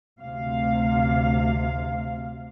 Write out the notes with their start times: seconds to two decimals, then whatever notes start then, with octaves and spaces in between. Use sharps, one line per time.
0.20 D2 C3 F5